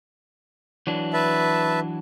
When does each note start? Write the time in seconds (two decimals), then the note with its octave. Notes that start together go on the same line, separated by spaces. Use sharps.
0.87 E3 F#3 D4
1.13 B4 E5 A5